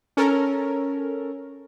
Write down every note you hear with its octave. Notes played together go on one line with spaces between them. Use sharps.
C#4 A4 A#4